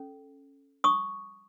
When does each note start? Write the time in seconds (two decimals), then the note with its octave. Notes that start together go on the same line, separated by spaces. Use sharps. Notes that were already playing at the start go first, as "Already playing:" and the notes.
Already playing: C#4 A4
0.84 C#6 D#6